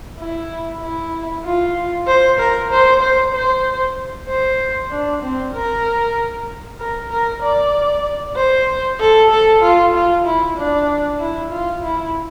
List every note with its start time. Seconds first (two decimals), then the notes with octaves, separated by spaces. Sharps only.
0.19 E4
0.81 E4
1.45 F4
2.07 C5
2.39 A#4
2.71 C5
3.02 C5
3.34 C5
4.28 C5
4.91 D4
5.22 C4
5.54 A#4
6.80 A#4
7.11 A#4
7.42 D5
8.36 C5
9.00 A4
9.31 A4
9.62 F4
9.94 F4
10.26 E4
10.57 D4
11.20 E4
11.51 F4
11.83 E4